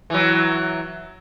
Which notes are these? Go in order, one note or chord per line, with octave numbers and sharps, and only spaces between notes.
E3 F#3